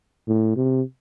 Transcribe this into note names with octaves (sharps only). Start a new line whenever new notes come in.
A2
C3